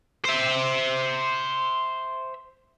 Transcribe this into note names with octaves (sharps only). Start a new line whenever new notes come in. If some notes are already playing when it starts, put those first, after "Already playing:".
C5 E5